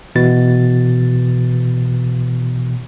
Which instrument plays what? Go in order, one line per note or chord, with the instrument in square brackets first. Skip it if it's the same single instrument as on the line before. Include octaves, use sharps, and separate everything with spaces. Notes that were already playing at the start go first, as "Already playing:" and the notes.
[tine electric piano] B2 E3 A6